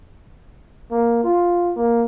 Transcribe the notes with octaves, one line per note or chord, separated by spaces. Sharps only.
A#3
F4
A#3